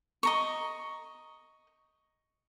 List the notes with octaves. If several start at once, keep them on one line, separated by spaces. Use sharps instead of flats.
D#5 A#5 C#6